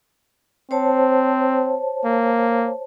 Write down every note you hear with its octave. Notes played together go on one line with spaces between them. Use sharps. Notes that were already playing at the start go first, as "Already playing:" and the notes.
C4 C5 C#5 A5
A#3